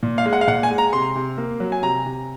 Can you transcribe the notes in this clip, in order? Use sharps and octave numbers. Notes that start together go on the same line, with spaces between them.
A#2
F5
G#3
F#5
F5
A#2 F#5
G#5
G#3
A#5
C3 C6
C3
A#3
F#3
G#5
C3 A#5
C3